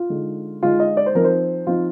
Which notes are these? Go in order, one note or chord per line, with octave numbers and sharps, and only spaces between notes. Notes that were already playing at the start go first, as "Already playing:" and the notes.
Already playing: F4
D3 G#3 D#4
D3 G#3 D#4 F4
D#5
D5
C5
F3 C4 D#4 A#4
C5
F3 C4 D#4 F4